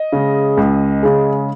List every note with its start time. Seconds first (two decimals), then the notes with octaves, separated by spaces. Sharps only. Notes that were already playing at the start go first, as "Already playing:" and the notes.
Already playing: D#5
0.12 C#3 G#3
0.57 C#2
1.03 C#3 G#3